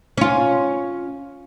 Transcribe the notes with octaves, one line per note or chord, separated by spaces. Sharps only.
C#4 F4